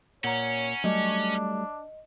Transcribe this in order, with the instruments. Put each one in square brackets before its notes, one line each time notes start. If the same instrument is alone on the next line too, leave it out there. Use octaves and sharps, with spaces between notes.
[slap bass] A#2 [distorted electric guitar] C#4 [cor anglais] C#5 [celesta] F#5 A#5
[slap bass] F#3 G3 A3 [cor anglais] D4 [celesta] D#5